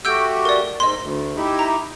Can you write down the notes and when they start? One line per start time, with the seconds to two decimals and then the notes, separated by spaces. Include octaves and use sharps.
0.05 A3 F#4 G4 E6 G6 D7
0.45 A#4 D5
0.80 G#2 D#5 C6
1.00 D2
1.37 D#4 E4 G4
1.59 A#5